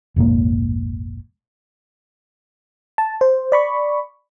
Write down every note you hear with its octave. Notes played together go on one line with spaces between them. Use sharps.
F1 A#1 G#2 A#3
A5
C5
D5 B5 C#6